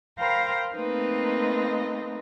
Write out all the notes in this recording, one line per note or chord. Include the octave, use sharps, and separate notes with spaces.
A#4 C5 F5 G5 A#5 B5
A3 A#3 C4 D#4 B4 D#5